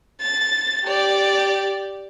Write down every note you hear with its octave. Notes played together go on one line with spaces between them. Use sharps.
A6
G4 D5